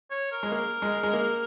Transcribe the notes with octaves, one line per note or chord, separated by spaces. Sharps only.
C#5
A#4
G#3
A#3 A#4
G#3
G#3
A#3